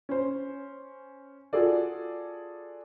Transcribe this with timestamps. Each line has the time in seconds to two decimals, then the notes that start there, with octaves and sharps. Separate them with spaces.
0.09 C#4 C5
1.53 F4 F#4 G#4 A4 D5